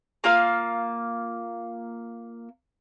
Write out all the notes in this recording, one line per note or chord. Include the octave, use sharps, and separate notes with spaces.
A#3 F4 F5 F6